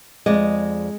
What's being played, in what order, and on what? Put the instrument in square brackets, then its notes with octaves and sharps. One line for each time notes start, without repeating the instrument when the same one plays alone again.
[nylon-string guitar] F2 D5 D#5 [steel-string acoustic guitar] G#3